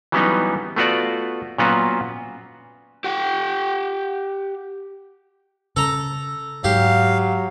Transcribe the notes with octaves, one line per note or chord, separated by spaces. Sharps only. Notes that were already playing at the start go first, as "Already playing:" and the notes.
E3 F#3 G3 B3 C#4 D#4
A3 B3 F4 F#4 D5
A#2 F#3 B3 C#4 F4 F#4
G4 F#5 G5
C#3 A4 A#5
G#2 F#3 G4 F5